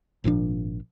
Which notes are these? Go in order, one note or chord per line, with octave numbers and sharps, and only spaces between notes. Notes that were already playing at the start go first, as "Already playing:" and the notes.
G#1 A#2 F3 D4